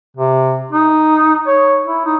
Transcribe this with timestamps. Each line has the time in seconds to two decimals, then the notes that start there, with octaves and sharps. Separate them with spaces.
0.16 C3
0.72 D#4
1.47 C#5
1.86 E4
2.05 D#4